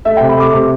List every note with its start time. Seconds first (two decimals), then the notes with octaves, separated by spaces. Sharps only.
0.05 A3 E5
0.17 G5
0.21 C3
0.29 B5
0.37 A3 D6
0.53 C3 D6